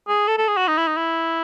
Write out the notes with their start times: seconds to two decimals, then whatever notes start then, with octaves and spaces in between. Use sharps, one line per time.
0.08 G#4
0.27 A4
0.38 A4
0.48 G#4
0.57 F#4
0.67 D#4
0.78 E4
0.87 D#4
0.97 E4